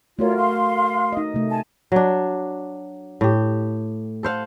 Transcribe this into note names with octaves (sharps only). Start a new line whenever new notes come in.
A3 F4 F#4 A#4 C#5 D5
F5 C6
D#4 D#5
C3 A3
G#5 A5
F#3 D4
A2 G4
A4 C5 F5 F#5